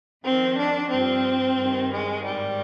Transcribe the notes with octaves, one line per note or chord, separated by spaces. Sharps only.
F2 D#3 C4
D4
G2 F3 C4
G2 D#3
G#3
G#2 D#3 G3